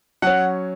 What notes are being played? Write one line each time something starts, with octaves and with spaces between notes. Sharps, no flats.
F#3 C#4 F#5